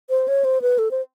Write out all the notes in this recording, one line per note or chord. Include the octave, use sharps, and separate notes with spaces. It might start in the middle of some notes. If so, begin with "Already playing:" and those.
C5
C#5
C5
B4
A4
C5